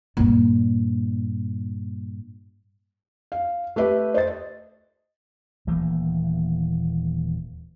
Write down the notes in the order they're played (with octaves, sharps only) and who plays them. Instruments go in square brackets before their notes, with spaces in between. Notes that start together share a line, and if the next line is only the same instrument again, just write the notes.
[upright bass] G2 A#2
[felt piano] F5
A3 G4 B4 E5
C5 D#5 A6
[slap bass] D#1 E3 A3 A#3